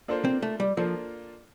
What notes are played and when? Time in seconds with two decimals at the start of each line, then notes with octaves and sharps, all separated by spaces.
0.08 A#3 D4 F4 A4 C5
0.25 C4
0.42 A3
0.60 G3
0.77 F3 A#3 D4 F4 A4 C5